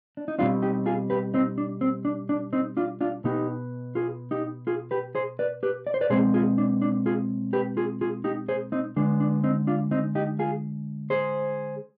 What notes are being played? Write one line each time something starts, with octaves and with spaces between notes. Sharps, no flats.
D4
D#4
B2 G3 C4 D4 F4
D#4 G4
F4 G#4
G4 B4
C4 D#4
D4
C4
D4
D4
C4 D#4
D4 F4
D4 F4
B2 B3 D#4 G4
F4 G#4
D#4 G4
F4 G#4
G4 B4
G#4 C5
B4 D5
G4 B4
D5
C5
B4 D5
B2 G#3 C4 G#4 C5
F4 G#4
D4
D4
F4 G#4
G4 B4
F4 G#4
F4 G#4
D#4 G4
G#4 C5
C4 D#4
D3 G#3 B3 D4
D4
C4 D#4
D4 F4
C4 D#4
D#4 G4
F4 G#4
G#4 C5